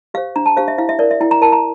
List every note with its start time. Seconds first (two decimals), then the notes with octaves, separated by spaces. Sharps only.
0.14 G4 F5
0.17 C5
0.36 D4 A#5
0.46 A5
0.56 G4 C5 F5
0.68 E5
0.78 E4 F5
0.89 E5
0.99 A#4 D5
1.11 E5
1.20 E4 G5
1.31 A#5
1.42 A#4 A5
1.52 A#5